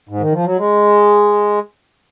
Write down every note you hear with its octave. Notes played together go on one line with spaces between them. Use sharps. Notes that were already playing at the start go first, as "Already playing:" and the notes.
G#2
D#3
F3
F#3
G#3